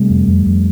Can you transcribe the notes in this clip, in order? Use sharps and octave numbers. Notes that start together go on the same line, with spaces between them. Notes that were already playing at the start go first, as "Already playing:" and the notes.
Already playing: C3 G3 A3
F2
F2
F2